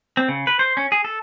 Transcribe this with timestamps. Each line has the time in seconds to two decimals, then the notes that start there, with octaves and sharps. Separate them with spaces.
0.17 C4
0.29 C#3
0.47 B4
0.59 C5
0.77 C#4
0.92 G#4
1.05 A4